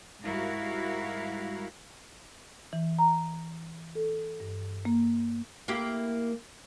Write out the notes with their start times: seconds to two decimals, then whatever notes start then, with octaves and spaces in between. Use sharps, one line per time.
0.21 G#2 G3 E4 F#4 A#4 F5
2.73 E3
2.99 A#5
3.95 A4
4.40 G2
4.85 A#3
5.68 A#3 E4 G4